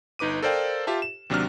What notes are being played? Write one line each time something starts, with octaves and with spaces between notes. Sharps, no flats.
G1 D#4 B4 D6 D#7
A4 A#4 C5 D5 F5 G5
F4 G4 E5 A5
E7
D#2 C3 F#3 D4 A5 F6